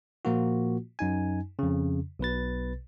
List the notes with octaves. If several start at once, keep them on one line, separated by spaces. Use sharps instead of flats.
A#2 F3 A#3 F4 F#4
F#2 D#4 G#5
F2 C#3
B1 B2 B4 A6